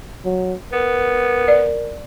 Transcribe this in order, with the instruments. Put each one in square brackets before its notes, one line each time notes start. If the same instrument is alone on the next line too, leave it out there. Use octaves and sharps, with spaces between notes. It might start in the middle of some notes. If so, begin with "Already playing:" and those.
[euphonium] F#3
[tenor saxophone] B3 [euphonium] A#4
[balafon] D5